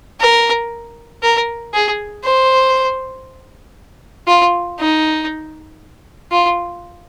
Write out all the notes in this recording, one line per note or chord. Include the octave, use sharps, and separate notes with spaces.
A#4
A#4
G#4
C5
F4
D#4
F4